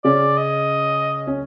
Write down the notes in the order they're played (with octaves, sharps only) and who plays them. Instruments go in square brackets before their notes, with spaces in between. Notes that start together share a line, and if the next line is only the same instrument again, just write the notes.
[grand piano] C#3 C#4 [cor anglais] D5
[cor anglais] D#5
[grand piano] C#4